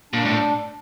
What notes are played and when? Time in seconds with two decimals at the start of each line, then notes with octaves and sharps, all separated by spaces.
0.13 A#2 D4
0.25 A2